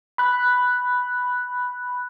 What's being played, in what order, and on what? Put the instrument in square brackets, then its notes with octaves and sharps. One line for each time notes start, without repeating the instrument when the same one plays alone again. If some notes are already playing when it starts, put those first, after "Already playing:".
[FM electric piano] B5 F#6